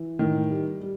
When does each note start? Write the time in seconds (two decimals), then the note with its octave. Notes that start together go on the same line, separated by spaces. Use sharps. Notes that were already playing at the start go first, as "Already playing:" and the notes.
Already playing: E3
0.19 A2 D#3
0.50 G3
0.82 G3